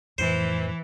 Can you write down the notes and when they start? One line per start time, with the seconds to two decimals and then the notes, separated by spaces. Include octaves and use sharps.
0.18 F2 A2 E3 C5